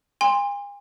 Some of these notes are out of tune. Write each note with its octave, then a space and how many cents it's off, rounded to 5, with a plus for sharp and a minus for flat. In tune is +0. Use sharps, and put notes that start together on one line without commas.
G#5 -40 C6 +0